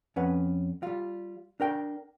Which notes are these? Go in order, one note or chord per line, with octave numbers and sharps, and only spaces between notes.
F2 C#4 B4 F#5
G3 F4
D4 A#4 G5